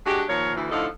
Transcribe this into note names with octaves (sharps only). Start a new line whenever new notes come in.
G#3 D4 F#4 G4
D#2 F3 A#4 C#5
D2 E3
A2 D3 F3 D#4 A4